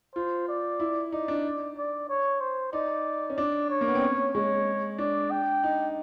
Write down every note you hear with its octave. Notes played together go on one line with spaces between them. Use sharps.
F4 C5
D5
E4
D#4 D5
D4
D5
C#5
C5
D#4 D5
C#4
D4 D5
C#5
A#3
B3
C4
C#4
G#3 C#5
D4 D5
G5
D#4